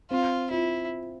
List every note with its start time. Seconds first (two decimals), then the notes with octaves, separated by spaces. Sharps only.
0.11 C4 F4
0.51 E4 F4